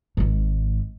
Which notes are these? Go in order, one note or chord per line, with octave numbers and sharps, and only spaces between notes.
G#1 G#2